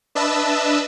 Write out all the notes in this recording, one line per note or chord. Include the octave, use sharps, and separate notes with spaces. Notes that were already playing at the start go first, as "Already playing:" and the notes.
D4 B4 D#5 E5 A5 E6